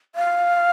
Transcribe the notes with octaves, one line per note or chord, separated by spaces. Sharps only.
F5